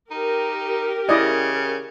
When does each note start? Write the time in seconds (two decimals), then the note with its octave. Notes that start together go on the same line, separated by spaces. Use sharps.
0.11 D#4 G4 A#4
1.09 C#3 E4 D5 D#5